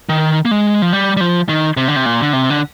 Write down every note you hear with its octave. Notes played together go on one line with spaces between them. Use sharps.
D#3
A#3
G#3
F3
G3
G3
F3
D#3
C3
D3
C3
A#2
D3
C3
D3